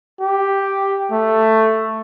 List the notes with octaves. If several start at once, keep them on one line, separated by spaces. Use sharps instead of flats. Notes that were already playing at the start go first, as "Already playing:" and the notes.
G4
A3